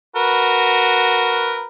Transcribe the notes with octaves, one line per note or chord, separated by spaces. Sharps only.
F#4 A#4 B4